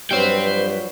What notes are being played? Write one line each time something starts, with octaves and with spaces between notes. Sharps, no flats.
G2 F3 F#3 B4 C5 G5